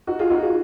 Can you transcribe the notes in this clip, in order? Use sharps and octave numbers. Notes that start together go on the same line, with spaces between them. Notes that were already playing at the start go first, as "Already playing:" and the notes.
D#4 F#4
F4 G#4
D#4 F#4
F4 G#4